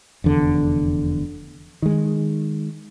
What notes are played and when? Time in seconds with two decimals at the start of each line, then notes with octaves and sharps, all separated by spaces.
0.24 F1 E2 D3
1.82 D#3 G#3